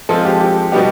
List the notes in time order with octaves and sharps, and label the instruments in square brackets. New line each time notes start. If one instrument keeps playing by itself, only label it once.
[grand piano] F3 G#3 C4 F4 [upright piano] A4
[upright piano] G4
G4
[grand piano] B2 G3 B3 D#4 [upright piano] G4